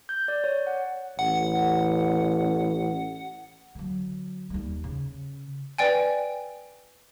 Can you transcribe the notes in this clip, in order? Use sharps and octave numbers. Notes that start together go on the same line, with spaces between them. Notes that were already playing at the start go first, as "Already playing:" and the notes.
G6
D5
C#5
F#5
A1 F#5
D3 F#3
D#2 G3
C#3
B4 D5 G5 G#5